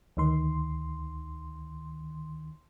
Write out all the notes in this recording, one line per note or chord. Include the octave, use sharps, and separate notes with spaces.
D2 D#3 C6